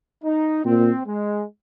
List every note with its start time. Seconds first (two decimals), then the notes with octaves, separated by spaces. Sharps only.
0.24 D#4
0.64 A#2 C4
1.06 G#3